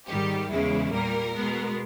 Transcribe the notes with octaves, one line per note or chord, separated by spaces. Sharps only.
G#2 D#3 G3 G4
E2 C#3 E3 G#3 E4
A#2 G3 A#3 A#4
B2 G#3 B3